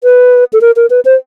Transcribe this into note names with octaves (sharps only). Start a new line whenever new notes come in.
B4
A4
A#4
A#4
B4
C5